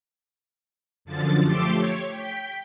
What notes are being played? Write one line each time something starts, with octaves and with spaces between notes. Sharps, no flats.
F#2 D3 F3 A6
F3 A3 G4 A4 C6 D6
C#5
G5 B6